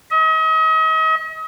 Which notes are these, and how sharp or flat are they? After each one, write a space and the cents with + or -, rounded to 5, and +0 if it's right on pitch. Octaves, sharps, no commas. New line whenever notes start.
D#5 +40